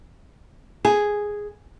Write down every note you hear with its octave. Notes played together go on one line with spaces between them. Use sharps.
G#4 G#5